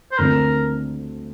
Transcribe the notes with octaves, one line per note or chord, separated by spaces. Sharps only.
C5
D2 D3 F3 C4 A#4